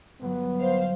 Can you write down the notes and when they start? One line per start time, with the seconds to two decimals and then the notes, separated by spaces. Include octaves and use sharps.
0.21 G1 F#3 B3
0.60 C5 F5